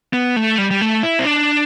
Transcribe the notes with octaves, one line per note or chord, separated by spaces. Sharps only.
B3
A3
G3
G3
A3
E4
C4
D4